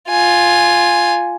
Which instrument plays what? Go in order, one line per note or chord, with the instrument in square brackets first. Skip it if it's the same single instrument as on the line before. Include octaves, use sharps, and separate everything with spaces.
[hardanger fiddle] F4 G#5